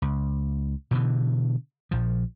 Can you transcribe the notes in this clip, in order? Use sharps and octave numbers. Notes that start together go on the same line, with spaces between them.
C#2
B2 D3 E3
A#1 F3